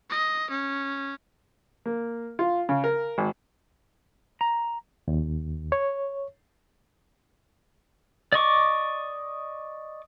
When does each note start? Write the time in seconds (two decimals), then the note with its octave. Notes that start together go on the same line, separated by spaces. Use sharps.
0.10 D#5
0.50 C#4
1.86 A#3
2.39 F4
2.69 C#3
2.84 A#4
3.18 G#1
4.41 A#5
5.08 D#2
5.72 C#5
8.32 D5 D#5 C#6 D6